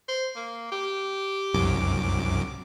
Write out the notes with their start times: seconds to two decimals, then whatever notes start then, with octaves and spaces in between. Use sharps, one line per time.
0.08 C5
0.36 A#3
0.72 G4
1.54 C2 F#2 D6